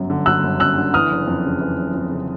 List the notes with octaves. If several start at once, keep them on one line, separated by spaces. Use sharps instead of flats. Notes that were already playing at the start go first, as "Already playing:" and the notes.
Already playing: G1 F#2 F#3
D3
F#3 E6 F#6
G1
F#2 E6 F#6
D3
E3 D#6 F6
F#1
F2
C#3
E3
F#1
F2
C#3